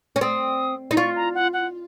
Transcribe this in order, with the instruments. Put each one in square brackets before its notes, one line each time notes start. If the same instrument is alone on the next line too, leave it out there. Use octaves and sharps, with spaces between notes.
[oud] C#4
[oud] C4 [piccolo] D#6
[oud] D#4
[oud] F4 [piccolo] C#6
[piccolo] A#5
F#5
F#5